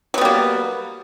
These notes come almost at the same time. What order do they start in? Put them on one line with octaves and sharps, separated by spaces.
F#3 B3 G3 A#3